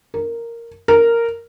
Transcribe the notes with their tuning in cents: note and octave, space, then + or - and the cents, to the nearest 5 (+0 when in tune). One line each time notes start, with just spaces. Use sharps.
A#4 -5
A#4 -5